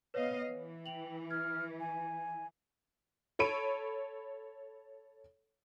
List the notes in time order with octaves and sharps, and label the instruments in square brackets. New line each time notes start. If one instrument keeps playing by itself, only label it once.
[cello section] B3 D#5 F5 [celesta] B4 C#5
[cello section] E3
[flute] G5 [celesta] F7 F#7
[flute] F6 [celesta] G#6
[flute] G#5
[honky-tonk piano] A4 C#5 B5 D7 D#7